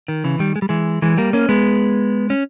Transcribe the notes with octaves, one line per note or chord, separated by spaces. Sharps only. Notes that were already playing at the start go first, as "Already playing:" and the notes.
D#3
C#3 E3
D#3 G3
G#3
G3
E3 G#3
E3 G#3
G3 A#3
A#3 C#4
G#3 B3
C#4